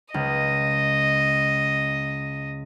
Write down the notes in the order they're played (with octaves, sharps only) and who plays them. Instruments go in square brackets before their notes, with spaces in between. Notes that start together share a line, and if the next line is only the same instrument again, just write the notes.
[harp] C#2 [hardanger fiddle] D#5